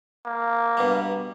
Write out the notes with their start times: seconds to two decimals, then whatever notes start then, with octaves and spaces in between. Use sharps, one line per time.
0.26 A#3
0.77 G2 B2 G3